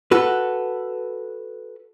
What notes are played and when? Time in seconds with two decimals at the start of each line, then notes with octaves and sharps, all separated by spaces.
0.11 F#4 A4 B4